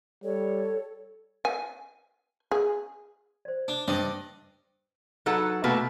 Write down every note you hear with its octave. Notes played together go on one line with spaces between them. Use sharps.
G3 A4 C#5
G#5
G#4
C5 D5
D4
G2 C5 D5 D#5 G5
F#3 D#4 A4 B4 F#5
B2 A3 A#3 F#4 B4